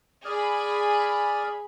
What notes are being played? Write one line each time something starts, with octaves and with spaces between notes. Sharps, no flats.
G#4 D5 B5 D#6 F6